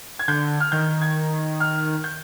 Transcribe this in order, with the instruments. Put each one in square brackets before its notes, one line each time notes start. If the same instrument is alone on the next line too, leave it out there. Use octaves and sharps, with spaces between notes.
[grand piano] G#6
[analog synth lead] D3 [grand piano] G6
[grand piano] F6
[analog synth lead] D#3 [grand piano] G6
[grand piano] G#6
F6
G6